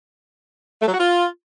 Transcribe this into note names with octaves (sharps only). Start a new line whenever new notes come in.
A3
F#3
F#4
F4